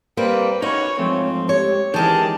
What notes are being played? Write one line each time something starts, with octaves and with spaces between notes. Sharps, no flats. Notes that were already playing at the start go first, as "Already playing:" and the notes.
G3 A#3 C4 B4
C#4 D#4 F#4 B4 C#5
G#2 F3 A3 C4
G4 C#5
D#3 E3 G#3 C#4 G4 G#4 A#4 A5